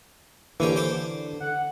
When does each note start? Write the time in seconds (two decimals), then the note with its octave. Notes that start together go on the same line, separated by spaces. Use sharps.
0.60 D3 E3 A#3 C#4 G4
0.76 C5 D6
1.40 F#5